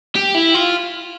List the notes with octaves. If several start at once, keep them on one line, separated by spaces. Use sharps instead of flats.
G4
E4
F4